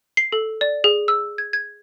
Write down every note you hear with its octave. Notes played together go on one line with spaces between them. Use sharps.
C7
A4
D5
G#4
E6
G#6
G#6